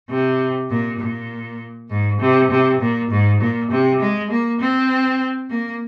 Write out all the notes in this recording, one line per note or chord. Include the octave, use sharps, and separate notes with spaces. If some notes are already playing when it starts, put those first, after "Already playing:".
C3
A#2
A#2
G#2
C3
C3
A#2
G#2
A#2
C3
G#3
A#3
C4
A#3